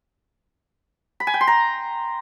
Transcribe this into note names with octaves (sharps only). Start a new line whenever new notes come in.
B5
G#5
G5
C6
A#5